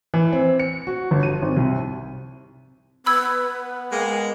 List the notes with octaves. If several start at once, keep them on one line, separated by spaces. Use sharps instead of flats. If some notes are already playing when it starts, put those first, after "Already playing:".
E3
C4
C#7
F#4
G1
D#7
G#1
C2
B3 B4 B5 E6 G#6
G#3 A#3 G5